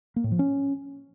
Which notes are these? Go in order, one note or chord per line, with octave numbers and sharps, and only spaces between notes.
A#3
A2
F3
C#4